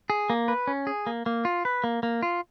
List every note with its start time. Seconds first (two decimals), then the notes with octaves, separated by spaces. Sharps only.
0.10 G#4
0.30 A#3
0.48 B4
0.67 C#4
0.87 G#4
1.07 A#3
1.26 A#3
1.45 F4
1.65 B4
1.84 A#3
2.03 A#3
2.23 F4